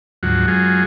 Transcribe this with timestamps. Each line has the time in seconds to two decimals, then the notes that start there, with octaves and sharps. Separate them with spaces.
0.23 D2 G#2 F3 F#3 F#4
0.48 F#2 F#3 G#3 F4 G#4